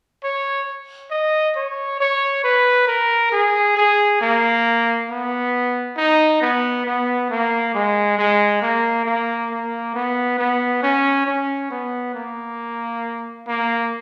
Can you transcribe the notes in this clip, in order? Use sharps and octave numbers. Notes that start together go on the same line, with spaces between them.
C#5
D#5
C#5
C#5
B4
A#4
G#4
G#4
A#3
B3
D#4
B3
B3
A#3
G#3
G#3
A#3
A#3
A#3
B3
B3
C#4
C#4
B3
A#3
A#3